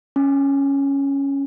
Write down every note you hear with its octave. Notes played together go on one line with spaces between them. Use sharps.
C#4